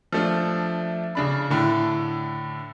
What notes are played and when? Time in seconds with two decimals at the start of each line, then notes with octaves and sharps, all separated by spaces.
0.12 F3 A3 D4
1.15 C#3 D4 B5
1.50 A2 D3